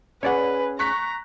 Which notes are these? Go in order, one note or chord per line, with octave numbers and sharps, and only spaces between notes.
C#4 G#4 B4 C#5 D5 F#5
A#5 C#6 F#6 B6